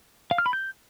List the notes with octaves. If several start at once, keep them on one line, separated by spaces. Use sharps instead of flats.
F5
F6
B5
G6